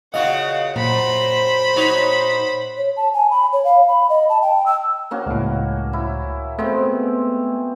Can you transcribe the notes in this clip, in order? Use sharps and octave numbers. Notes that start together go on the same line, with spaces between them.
A#2 C#3 F#4 D#5 F5 F#5
F#2 A#2 C5 B5
D#4 F#4 C#5
C#5
A5
G#5
B5
C#5
F5
B5
D#5
A5
G5
E6
A#3 C#4 F#4
C#2 A2
E4
B2 G#3 A3 C4